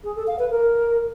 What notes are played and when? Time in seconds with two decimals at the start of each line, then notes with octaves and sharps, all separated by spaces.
0.04 G#4
0.16 A4
0.27 F5
0.39 B4
0.50 A#4